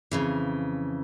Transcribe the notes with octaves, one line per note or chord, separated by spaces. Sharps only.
F2 C#3 E3